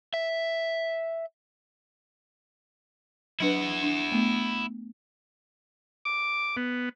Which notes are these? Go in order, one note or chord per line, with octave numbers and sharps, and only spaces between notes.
E5
F#3 D4 E4 B4 F#5
D4
A3 B3
D6
B3